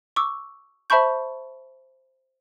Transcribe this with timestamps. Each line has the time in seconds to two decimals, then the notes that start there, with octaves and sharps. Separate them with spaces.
0.16 C#6 D6 E6
0.90 C5 E5 A5 B5 C#6 G6